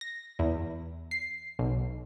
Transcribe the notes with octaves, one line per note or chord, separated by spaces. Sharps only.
A#6
E2
C7
B1